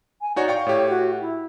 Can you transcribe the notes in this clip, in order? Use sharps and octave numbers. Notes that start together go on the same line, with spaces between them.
G#5
D#4 F#4 C#5 D5
F5 G5 C#6
A2 G4 C#5
F#4
E4